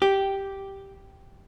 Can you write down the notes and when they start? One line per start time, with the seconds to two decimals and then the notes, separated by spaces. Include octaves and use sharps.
0.02 G4